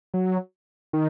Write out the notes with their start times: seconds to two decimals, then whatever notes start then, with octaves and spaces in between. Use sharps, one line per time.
0.14 F#3
0.93 D#3